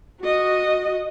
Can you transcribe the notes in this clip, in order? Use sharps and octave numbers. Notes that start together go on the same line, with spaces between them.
F#4 D#5